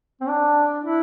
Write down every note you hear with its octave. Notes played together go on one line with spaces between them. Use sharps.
C4
D4
E4